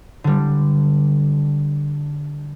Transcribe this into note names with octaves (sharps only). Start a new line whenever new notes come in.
D3 G3